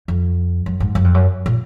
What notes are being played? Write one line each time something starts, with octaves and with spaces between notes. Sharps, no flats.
F2
F#2
G#2
F#2
F2
F#2
A#2